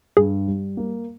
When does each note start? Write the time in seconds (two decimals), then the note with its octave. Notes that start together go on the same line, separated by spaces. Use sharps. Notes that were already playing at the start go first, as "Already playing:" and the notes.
0.17 G2 G#4
0.48 G3
0.77 A#3